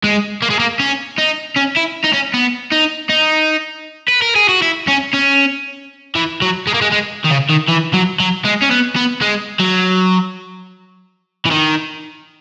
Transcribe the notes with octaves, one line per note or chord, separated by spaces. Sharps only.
G#3
A#3
G#3
A#3
C#4
D#4
C#4
E4
D#4
C#4
B3
D#4
D#4
B4
A#4
G#4
F#4
E4
C#4
C#4
E3
F#3
G#3
A#3
G#3
G#3
D#3
C#3
D#3
E3
F#3
F#3
G#3
C#4
B3
B3
G#3
F#3
E3
D#3